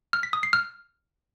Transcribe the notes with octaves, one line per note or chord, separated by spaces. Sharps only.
F6
B6
D#6
C7
F6